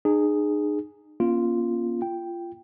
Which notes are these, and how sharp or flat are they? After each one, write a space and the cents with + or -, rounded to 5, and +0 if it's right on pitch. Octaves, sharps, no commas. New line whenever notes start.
D#4 -40 G#4 +0
A#3 +40 C#4 +0 F4 -5
F4 -20 G5 +0